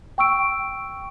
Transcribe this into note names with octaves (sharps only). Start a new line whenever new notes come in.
G5 C#6 E6 D7